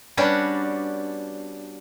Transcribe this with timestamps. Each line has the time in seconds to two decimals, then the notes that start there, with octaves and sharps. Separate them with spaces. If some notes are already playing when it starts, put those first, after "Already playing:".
0.17 G3 B3 C#4 D4 F#4